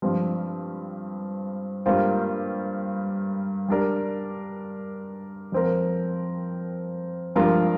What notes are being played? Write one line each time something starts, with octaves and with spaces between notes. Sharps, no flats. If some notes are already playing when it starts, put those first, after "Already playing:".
G2 F3 C4
G2 G3 A#3 F4 C5
G3 D4 A#4 D5
F2 F3 C4 A#4
G2 F3 D4 F4 A#4